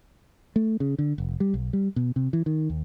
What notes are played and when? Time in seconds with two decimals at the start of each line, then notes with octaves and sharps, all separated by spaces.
0.56 A3
0.80 C#3
0.99 D3
1.18 F1
1.40 G3
1.54 B1
1.73 G3
1.96 B2
2.16 C3
2.33 E3
2.46 D#3
2.70 D#2